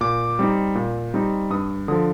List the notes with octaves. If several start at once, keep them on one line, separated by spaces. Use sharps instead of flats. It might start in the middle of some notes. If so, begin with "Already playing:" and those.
A#2 D6
G3 C4 D#4
A#2
G3 C4 D#4
G2 D#6
D3 F3 D#6